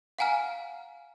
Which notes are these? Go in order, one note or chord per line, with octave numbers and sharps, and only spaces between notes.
F5 F#5 G#5 A#5 F6